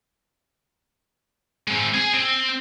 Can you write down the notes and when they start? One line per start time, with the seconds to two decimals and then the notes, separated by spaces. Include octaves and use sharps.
1.68 G#3 C4
1.94 G#4 G#5
2.14 C4